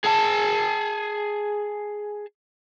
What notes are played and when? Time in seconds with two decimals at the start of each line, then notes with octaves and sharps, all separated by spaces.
0.05 G#4 A5